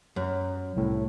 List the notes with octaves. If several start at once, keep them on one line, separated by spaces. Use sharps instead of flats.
F#2
C2 A2